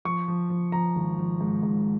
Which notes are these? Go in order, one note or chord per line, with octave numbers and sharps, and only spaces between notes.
F3 C#6
F3
F3
F3 A#5
G#1
F3
G#2
G#2